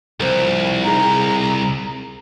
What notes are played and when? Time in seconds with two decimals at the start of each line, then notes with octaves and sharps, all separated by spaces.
0.20 C2 F3 C4 A#4
0.84 D#4 G#4 A#5